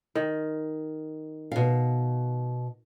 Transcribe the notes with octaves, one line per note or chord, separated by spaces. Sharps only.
D#3
B2 F5